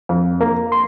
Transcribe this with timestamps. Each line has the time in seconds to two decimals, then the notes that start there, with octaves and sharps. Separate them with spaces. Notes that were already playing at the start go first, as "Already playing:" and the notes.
0.09 F2
0.41 A#3
0.72 C6